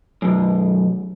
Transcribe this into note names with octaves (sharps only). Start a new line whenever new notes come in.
B1 F#2